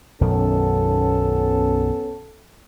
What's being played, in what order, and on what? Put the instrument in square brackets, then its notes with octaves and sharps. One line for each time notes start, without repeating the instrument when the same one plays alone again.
[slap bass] B1 F#2 D#3 [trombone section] B3 C#4 A4